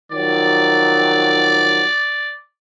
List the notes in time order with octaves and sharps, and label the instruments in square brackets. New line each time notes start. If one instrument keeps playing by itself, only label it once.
[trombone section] D#3 F3 F#3 [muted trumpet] D5